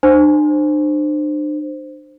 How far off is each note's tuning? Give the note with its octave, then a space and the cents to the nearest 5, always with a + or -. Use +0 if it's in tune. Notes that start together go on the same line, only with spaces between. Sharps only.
D4 +40 C5 +0